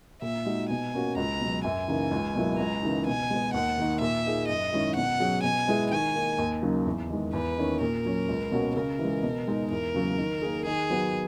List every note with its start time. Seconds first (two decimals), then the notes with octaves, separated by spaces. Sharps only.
0.22 A#2 E5
0.45 G#3 D#4 F#4
0.70 B2 G#5
0.94 A#3 C#4 F#4
1.16 C#2 A#5
1.40 B2 F#3
1.64 F#2 G#5
1.88 C#3 E3 A#3 D#4
2.11 C#2
2.35 B2 F#3 A#3 E4
2.59 C#2 A#5
2.83 C#3 E3 A#3 D#4
3.07 B2 G#5
3.30 G#3 B3
3.54 D#2 F#5
3.78 D#3 A#3 D#4
4.01 A#2 E5
4.26 A#3 D#4 G#4
4.48 F#2 D#5
4.72 D#3 G#3 C#4 E4
4.96 B2 F#5
5.20 F#3 C#4 G#4
5.43 B2 G#5
5.68 G#3 B3 E4 G#4
5.91 D#3 G#5
6.15 A#3 D#4
6.38 D#2
6.62 C#3 F#3 A#3 D#4
6.86 E2
7.10 D#3 G#3
7.33 E2 B4
7.58 D#3 A#3 C#4
7.81 A#2 A#4
8.05 F#3 C#4
8.29 C#2
8.52 B2 A#3 C#4 F#4
8.76 C#3 A#4
8.99 E3
9.04 G#3
9.23 B2
9.48 G#3 D#4
9.71 E2 A#4
9.95 C#3 F#3 A#3
10.18 D#3
10.42 A#3 D#4 G#4
10.66 D#3 G#4
10.90 F#3 B3 F#4